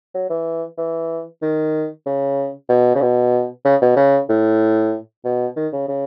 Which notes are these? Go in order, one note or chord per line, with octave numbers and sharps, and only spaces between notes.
F#3
E3
E3
D#3
C#3
B2
C#3
B2
C#3
B2
C#3
A2
B2
D#3
C#3
C#3